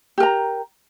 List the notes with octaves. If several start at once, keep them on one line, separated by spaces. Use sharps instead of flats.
G4 A#4 A#5